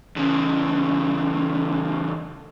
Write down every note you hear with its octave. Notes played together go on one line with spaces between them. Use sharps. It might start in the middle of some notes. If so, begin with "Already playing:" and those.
E2 C#3